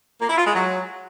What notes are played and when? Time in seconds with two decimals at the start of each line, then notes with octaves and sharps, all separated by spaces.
0.21 A#3
0.29 E4
0.38 F4
0.46 G#3
0.54 F#3